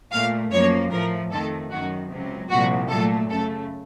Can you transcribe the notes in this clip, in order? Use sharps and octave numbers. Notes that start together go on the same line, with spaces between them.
A#2 A3 F5
F#2 F3 A#3 C#5
A2 F3 A3 A#4
F2 D#3 A3 A4
F#2 D#3 F#3 F#4
C#2 C3 F#3
C2 A#2 F3 F#4
A#2 F#3 A3 A4
F#2 C#3 A3 A4